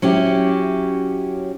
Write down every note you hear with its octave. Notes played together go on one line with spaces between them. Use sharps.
F#3 C#4 E4 G4